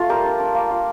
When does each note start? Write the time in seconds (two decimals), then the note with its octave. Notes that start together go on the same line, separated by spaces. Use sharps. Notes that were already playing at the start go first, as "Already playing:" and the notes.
Already playing: A3 F4
0.09 G3 G4 A#4
0.25 D4
0.40 D4
0.54 A#3
0.71 F4